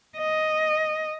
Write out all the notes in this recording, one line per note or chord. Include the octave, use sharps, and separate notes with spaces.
D#5